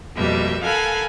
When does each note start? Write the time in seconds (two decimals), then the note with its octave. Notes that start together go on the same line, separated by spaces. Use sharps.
0.16 F2 B2 G3 A#3 E5
0.63 A4 A#4 F5 F#5 G#5 B5